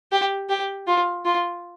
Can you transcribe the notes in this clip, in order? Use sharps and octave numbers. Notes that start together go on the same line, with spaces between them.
G4
G4
F4
F4